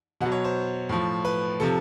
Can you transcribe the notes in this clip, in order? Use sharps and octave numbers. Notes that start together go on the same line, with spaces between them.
B2 F#5
F#3
C#5
C5
A2 F3
B4
C3 F3 A4